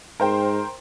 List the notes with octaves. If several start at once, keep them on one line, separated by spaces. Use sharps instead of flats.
G#2 A#4 C5 G5